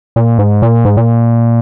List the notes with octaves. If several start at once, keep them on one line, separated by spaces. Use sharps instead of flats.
A#2
G#2
A#2
G#2
A#2